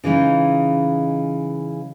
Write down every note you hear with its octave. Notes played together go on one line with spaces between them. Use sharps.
C#3 E3 G#3 D#4